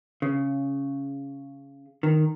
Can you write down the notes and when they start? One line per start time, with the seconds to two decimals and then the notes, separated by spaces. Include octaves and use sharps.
0.22 C#3
2.03 D#3